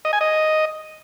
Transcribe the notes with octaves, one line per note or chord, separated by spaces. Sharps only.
D#5
G#5
D#5